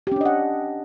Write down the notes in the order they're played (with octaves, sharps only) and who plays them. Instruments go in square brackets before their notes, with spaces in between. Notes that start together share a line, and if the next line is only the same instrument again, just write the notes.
[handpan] G4
C#4
D4
D#5
F#5